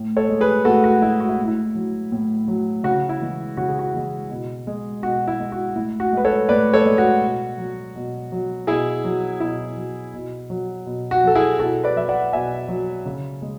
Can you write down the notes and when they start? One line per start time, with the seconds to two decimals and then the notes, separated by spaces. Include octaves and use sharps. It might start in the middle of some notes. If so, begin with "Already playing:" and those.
Already playing: A2
0.17 A4 C#5
0.29 G#3
0.41 G#4 B4
0.65 A2 F#4 A4
0.84 F#4
1.02 G#3 E4
1.20 F#4
1.29 E4
1.38 A2
1.47 E4
1.75 F#3
2.12 A2
2.48 F#3
2.84 C#3 F#4
3.09 E4
3.20 E3 G#3
3.57 C#3 F#4
3.68 G#4
3.79 F#4
3.94 E3 G#3
4.30 B2
4.67 G#3
5.03 B2 F#4
5.27 E4
5.40 G#3
5.52 F#4
5.76 A2 E4
6.00 F#4
6.13 G#3 B4
6.25 A4 C#5
6.49 A2 B4 D5
6.74 A4 C#5
6.85 G#3
6.98 F#4
7.22 B2
7.58 F#3
7.96 B2
8.32 F#3
8.67 B2 E4 G#4
9.04 F#3
9.40 B2 E4
9.77 F#3
10.14 B2
10.50 F#3
10.86 B2
11.11 F#4
11.24 F#3 A4
11.35 E4 G#4
11.59 B2 F#4 A4
11.84 B4 D5
11.96 F#3 E5
12.09 D5 F#5
12.33 B2 E5 G#5
12.69 F#3
13.06 C#3
13.42 G#3